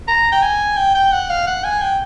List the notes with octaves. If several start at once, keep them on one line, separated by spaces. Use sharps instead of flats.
A#5
G5
G#5
G5
G5
F#5
F5
F#5
G#5
G5